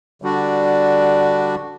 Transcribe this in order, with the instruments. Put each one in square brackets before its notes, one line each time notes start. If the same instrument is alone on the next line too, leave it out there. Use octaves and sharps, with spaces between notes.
[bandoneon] D3 G3 D4 F#4